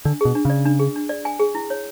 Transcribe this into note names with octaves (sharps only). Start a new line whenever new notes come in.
D3 D4
B2 G#4
D4
C#3 D5
D4
G#4
D4
D5
G#5
G#4
E4
C#5